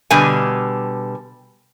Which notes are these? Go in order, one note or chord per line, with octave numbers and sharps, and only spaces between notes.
B2 D3 G3 G#5